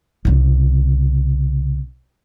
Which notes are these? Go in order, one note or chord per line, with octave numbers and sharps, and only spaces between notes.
C2 C#3